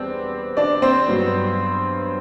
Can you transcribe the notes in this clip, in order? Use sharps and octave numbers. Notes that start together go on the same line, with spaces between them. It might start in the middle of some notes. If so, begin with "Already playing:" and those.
Already playing: E2 G3 B3 C4 D4
D4 D5
C4 C5
G2 F#3 B3